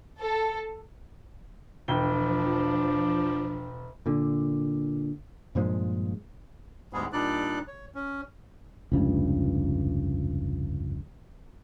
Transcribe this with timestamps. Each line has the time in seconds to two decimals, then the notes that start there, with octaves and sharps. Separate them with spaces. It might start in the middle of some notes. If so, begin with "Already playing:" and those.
0.19 A4
1.88 E1 F3 D4 G5 G7
4.06 A#2 D3
5.55 G2 A#2 F3 G#3
6.93 D2 G#2 G3 G#3 B3 G#4
7.13 A#2 G3 D4 D#4 D5 F#6
7.67 C#5
7.95 C#4
8.92 F1 C#2 G2